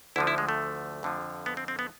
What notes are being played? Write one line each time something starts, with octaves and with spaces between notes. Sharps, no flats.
D2 D3 F3 E4
E4
G#3
A3
F2 D3 F3
B3
C4
C4
B3